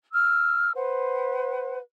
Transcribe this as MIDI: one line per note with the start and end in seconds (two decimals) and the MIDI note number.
0.12 0.72 88
0.12 0.72 89
0.74 1.79 71
0.74 1.79 72
0.74 1.79 78